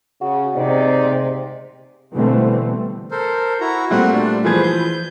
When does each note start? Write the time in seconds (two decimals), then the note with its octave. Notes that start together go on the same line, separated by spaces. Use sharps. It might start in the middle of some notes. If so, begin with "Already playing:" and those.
0.21 C#3 F#4
0.56 G#2 C3 D#4 D5
2.14 B2 D3 E3 G3 A3 C4
3.11 A4 A#4 C5
3.61 E4 F#4 A#5
3.91 A#2 G3 A3 C4 F#4 F#5
4.13 D4
4.45 E3 F3 G#4 B4 C5 G#6
4.63 G6